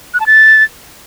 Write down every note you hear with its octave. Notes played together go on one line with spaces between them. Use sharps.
F#6
A5
A6